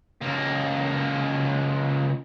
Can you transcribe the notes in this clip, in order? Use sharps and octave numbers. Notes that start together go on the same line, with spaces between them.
C#2 A#3